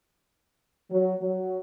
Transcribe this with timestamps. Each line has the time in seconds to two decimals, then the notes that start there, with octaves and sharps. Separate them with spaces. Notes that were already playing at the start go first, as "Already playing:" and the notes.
0.91 F#3
1.20 F#3